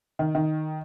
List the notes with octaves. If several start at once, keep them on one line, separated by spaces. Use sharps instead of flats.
D#3
D#3